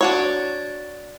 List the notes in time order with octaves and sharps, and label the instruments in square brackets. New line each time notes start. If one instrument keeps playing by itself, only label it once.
[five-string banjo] D4 F#4 C#5